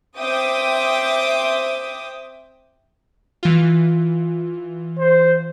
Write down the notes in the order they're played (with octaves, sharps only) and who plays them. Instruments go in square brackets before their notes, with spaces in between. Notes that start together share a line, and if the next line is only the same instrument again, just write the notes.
[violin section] C4 E5 G5 D6 D#6
[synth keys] E3 F4
[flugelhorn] C5